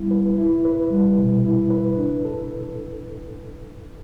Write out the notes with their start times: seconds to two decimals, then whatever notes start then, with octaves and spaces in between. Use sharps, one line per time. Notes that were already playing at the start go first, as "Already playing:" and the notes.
Already playing: G3 B3 E4
0.11 B4
0.38 E4
0.65 B4
0.91 G3
1.18 B2
1.45 E4
1.70 B4
1.97 D4
2.25 A4